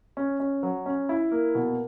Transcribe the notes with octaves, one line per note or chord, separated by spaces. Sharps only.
C#4
C#4
F#3
C#4
E4
A#3
B2